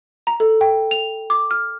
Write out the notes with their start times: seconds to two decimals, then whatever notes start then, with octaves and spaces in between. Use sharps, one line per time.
0.27 A#5
0.40 A4
0.61 G5
0.91 F7
1.30 D6
1.51 F6